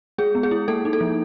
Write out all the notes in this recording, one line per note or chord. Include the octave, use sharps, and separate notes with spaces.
G#3 G#4
B3
G#4
E4
A#3 A4
D#4
A4
F3